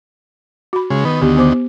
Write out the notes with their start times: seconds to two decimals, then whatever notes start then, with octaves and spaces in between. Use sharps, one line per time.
0.73 F#4 B5
0.90 C#3 G#3
1.05 D#3 B3
1.21 D2 D#3 B3 G4
1.37 B3 C5 D6